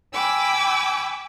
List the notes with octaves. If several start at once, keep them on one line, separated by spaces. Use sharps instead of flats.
G5 G#5 B5 D6 E6